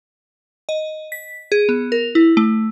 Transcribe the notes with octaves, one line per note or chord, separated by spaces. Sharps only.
D#5
B6
G#4
B3
A#4
E4
A3